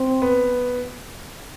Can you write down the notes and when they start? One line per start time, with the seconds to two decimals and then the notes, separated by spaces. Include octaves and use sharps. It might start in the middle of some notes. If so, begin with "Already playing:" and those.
Already playing: C4
0.22 B3